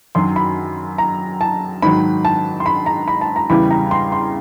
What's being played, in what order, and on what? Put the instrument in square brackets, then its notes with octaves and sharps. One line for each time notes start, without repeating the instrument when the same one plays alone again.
[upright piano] F#2 D#3 F#3 C6
B5
A#5
A5
G#2 D#3 F#3 B5
A5
C6
B5
A#5
B5
A5
A#5
E2 C#3 E3 G3 B5
A#5
C6
C6